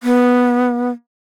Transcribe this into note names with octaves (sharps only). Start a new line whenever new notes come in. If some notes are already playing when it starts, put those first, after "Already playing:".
B3